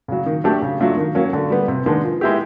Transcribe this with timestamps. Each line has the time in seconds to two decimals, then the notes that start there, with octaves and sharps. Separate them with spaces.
0.08 C#3 F#3
0.26 D#3
0.44 F#3 A3 D4 G4
0.62 C#3
0.80 F#3 A3 D4 F4
0.97 D#3
1.15 F#3 A#3 C#4
1.33 D3
1.50 G3 B3
1.68 C3
1.86 D#3 G#3 B3 D4
2.03 F3
2.21 G#3 B3 E4 G4